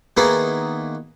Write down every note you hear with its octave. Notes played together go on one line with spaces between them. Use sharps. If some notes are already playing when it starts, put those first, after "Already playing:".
D#3 A#3 B3 D#4 E4 G#4